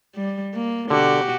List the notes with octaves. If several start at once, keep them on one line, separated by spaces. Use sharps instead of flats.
G3
A#3
B2 D3 F#4 G4